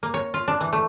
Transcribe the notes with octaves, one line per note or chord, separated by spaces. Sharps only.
A#3
C#5
F4
D4
E3
A3